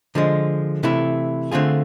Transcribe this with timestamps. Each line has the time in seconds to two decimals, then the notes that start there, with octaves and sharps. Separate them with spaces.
0.15 D3 F3 G#3
0.83 C3 E3 A3 E4
1.51 D3 A3 C4 F4 G#4